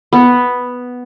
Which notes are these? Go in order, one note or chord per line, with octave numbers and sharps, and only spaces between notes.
B3